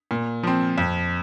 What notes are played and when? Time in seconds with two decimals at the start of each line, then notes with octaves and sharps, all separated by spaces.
0.11 A#2
0.43 F3 C4
0.78 F2